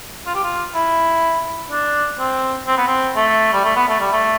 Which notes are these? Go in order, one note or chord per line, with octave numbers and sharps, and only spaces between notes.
F4
G4
F4
E4
D4
C4
C4
B3
C4
A3
G3
A3
B3
A3
G3
A3